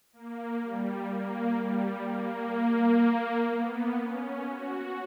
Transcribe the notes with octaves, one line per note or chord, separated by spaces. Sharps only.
A#3
G3
A#3
G3
A#3
B3
C#4
F#4